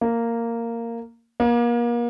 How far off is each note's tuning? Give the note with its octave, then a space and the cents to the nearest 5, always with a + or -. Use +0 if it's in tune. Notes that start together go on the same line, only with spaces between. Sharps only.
A#3 -10
A#3 +35